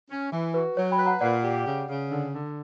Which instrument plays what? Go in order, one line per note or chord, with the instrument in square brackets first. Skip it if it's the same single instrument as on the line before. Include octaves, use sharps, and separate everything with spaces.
[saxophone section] C#4
E3
[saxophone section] F#4 [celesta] B4
[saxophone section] F#3 [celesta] C#5
[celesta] G5 B5
[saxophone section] B4
[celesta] F#5 A#5
[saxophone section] A#2 [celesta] D5 F#5
[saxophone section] G4
C#3
C#3
D3
D3